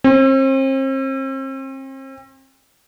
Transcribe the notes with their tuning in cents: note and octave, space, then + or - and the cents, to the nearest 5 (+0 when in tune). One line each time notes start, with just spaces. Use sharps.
C4 +40